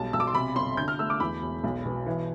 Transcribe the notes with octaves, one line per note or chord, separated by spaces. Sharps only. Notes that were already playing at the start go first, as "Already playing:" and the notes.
Already playing: B1 G3 A5
B1 E6
D6
C6
C3 B5
G1 C6
D3 G6
F6
A3 E6
D6
E2 B5
E1
B1
B2
E3